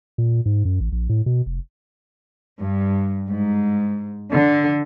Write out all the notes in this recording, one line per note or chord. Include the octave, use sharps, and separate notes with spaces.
A#2
G#2
F#2
A1
A#1
A2
B2
F1
G2
G#2
D3